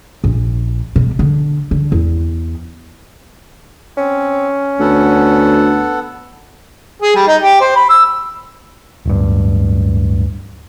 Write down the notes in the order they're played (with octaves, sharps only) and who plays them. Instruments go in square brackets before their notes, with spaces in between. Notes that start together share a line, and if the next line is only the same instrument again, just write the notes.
[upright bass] A#1
B2
D3
D3
E2
[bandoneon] C4 [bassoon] C#4
[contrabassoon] D2 [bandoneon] B3 A4 F#5
[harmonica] G#4
G3
D#4
G4
C5
B5
E6
[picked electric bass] D1 G2